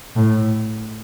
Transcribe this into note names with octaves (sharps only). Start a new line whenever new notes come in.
A2